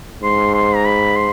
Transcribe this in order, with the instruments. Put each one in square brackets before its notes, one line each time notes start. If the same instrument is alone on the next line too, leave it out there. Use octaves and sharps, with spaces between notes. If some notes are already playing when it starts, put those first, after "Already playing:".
[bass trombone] G#2 [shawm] C6
[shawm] C6
A#5
B5
C6